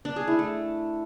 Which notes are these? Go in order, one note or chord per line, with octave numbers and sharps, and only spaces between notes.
D4
G#4
E4
A3